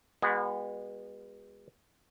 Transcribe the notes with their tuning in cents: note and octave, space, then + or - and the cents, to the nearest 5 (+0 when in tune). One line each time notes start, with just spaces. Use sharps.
G#3 -40 B3 -15 F#4 -40